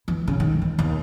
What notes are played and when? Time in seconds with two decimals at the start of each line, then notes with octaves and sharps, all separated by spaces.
0.08 E3
0.28 C#3
0.40 D#3
0.62 E3
0.79 D#2